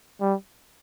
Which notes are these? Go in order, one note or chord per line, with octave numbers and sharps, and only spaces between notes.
G3